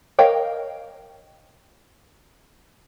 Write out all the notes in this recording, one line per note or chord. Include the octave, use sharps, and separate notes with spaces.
A#4 C#5 D#5 F5 G5